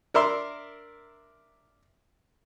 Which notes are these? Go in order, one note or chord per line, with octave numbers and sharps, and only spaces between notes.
D4 A#4 E5 C6